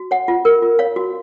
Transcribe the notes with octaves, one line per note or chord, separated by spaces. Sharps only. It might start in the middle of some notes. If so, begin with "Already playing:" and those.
Already playing: F#4
C#5 F#5
F4
A#4
F4
C#5 F5
F#4